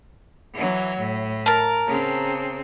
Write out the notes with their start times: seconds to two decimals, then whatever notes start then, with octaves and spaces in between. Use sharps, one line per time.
0.54 E3 F#3
0.98 A2
1.46 A#4 A5
1.87 C#3 C4